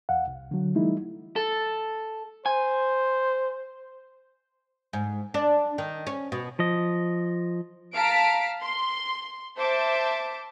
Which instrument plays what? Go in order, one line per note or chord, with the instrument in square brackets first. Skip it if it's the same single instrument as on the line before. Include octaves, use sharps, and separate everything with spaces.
[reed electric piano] E2 F5 F#5
C2
D3 F#3
E3 G3 A3 D#4 E4
[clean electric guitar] A4
[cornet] C5 [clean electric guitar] G#5
[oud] G#2
D4
D#3
C#4
B2
[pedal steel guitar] F3 D#5
[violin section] F5 A5 A#5 B6 D7
C6
C5 E5 A5 D6